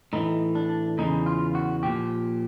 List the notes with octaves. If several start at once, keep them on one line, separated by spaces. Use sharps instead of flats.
A2 E3 D#4
D4
E2 C#3 E3 D#4
F4
F#4
A#2 F3 G4